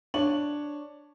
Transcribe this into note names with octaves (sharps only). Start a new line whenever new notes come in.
D4 C#5 F#7